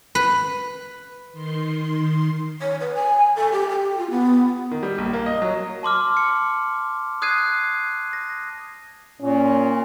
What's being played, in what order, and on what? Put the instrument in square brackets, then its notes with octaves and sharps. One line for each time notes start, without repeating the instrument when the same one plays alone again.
[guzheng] B4
[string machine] D#3 C6
[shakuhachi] C#5
B4
G#5
A4
G4
G4
F4
B3
[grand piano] D#3
G3
A#1
A#3
D#5
F#3
[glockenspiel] A5 C6 D6 F6
C#7
D#6 F#6 G#6 C7 D#7
A#6
[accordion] A#2 [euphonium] C#4